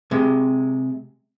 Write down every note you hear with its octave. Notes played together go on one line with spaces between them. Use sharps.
C3 G#3